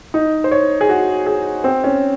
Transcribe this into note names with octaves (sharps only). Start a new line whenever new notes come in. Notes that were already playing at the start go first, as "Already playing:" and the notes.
D#4
C5
C#5
G#4
F#4
G#4
C4
C#4